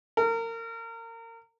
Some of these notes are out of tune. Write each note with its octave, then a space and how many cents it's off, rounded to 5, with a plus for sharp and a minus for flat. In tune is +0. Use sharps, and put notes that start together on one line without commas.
A#4 -30